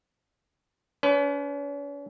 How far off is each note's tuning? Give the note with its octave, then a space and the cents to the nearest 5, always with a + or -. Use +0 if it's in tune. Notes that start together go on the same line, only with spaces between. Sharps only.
C#4 +45 B4 +35